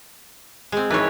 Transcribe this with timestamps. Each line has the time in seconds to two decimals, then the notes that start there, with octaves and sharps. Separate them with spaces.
0.72 G#3 C4
0.90 G#1 D#3 E3 B4 C#5